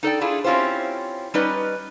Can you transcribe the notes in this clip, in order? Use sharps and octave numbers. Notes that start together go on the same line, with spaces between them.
D#4 A4 D5 G5
D4 E4 F4 G#4
C4 C#4 E4 F4 G4 C5
G3 C#4 D#4 B4 D5 D#5